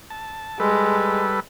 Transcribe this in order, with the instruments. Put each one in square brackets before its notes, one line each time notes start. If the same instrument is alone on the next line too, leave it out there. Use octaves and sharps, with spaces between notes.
[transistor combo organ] A5
[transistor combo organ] G3 A4 B4 [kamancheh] G#3